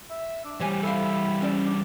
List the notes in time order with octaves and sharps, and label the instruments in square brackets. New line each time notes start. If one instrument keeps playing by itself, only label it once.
[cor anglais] E5
D4
[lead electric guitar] E3 G3 [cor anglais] G4 [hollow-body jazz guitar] C5 C#5 G#5
[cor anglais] E4 [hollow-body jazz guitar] A4 C5 F5
[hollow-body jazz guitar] C#4 C5 D5
[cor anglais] D4